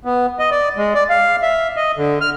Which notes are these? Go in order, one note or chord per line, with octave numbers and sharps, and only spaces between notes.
B3
D#5
D5
G#3
D5
F5
E5
D#5
D3
F6